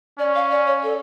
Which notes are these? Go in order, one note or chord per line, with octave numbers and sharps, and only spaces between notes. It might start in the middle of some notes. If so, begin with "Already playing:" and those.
C#4 D5
F5
D5
C#5
A4